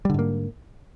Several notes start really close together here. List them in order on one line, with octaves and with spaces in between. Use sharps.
G3 D3 G#2 A#3